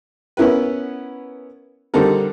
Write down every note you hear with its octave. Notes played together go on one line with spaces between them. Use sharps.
B3 C#4 E4 A#4 B4
D3 G3 C4 D#4 A4 A#4